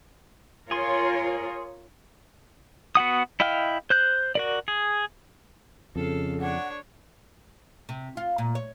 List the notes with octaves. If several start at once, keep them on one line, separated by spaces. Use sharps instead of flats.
F4 G#4 A#4 C#5 C6
B3 F#4 F#5 D#6
E4 D#5 F5 G5 F6
C5 F#6 G6
F#4 A#4 D5
G#4
F2 C#3 A4 F5
D4 C#5 F#5
C3
F4
A#2
C#5